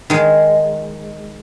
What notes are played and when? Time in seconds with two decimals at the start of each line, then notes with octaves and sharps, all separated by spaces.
0.10 D#3 G#3